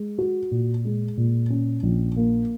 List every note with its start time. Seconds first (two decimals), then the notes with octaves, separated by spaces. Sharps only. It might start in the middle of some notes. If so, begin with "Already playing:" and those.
Already playing: G#3
0.18 F#4
0.51 A#2
0.85 G#3
1.17 A#2
1.50 C#4
1.83 A#1
2.16 A#3